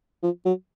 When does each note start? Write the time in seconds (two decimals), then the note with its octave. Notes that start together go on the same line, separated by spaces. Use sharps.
0.23 F3
0.46 F#3